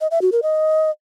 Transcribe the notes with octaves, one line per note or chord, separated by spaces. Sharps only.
D#5
E5
F#4
A#4
D#5